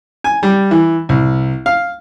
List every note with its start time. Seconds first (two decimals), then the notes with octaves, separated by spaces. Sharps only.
0.24 G#5
0.43 G3
0.71 E3
1.09 C2
1.66 F5